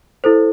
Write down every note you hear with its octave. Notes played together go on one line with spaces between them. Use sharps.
E4 A4 C5